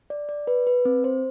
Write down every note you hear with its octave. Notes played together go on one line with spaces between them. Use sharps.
D5
D5
B4
B4
C4
C5